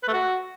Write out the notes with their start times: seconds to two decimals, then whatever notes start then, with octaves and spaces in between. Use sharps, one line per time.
0.03 B4
0.08 A3
0.13 F#4